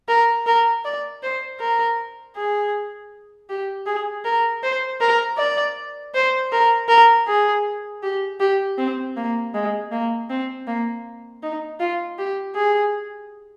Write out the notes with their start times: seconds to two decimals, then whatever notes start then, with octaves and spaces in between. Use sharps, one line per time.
0.08 A#4
0.46 A#4
0.85 D5
1.23 C5
1.60 A#4
2.36 G#4
3.50 G4
3.86 G#4
4.25 A#4
4.63 C5
5.01 A#4
5.37 D5
6.14 C5
6.52 A#4
6.89 A#4
7.28 G#4
8.03 G4
8.40 G4
8.78 C4
9.16 A#3
9.54 G#3
9.92 A#3
10.30 C4
10.67 A#3
11.43 D#4
11.80 F4
12.19 G4
12.56 G#4